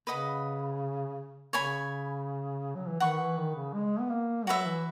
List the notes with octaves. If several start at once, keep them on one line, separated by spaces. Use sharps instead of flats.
C#3 B4 D#5 F#5 B5
C#3 C#5 G#5 B5
F#3
E3
D#3 B4 F#5 C#6
E3
D#3
C#3
G#3
B3
A#3
F#3 F#4 B4 E5
E3